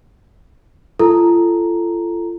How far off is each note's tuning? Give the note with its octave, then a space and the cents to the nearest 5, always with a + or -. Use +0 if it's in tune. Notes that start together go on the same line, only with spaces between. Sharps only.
F4 -35 A4 +0 A#5 +0